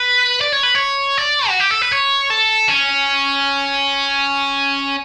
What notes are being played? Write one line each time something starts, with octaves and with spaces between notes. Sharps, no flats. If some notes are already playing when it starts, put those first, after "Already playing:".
Already playing: B4
D5
C#5
B4
C#5
D5
F#4
G4
A4
B4
C#5
A4
C#4